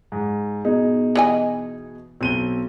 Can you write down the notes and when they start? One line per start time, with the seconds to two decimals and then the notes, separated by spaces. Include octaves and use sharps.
0.12 G#2
0.65 B2 D#4 G#4
1.15 E3 D#5 G#5
2.21 B1 C4 D#7 G7